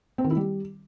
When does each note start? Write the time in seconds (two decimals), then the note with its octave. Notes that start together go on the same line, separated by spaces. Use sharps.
0.18 C4
0.24 D#3
0.31 E4
0.37 G3